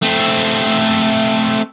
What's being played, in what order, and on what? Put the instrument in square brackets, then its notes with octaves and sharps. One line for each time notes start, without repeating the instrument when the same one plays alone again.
[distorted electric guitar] A3 C4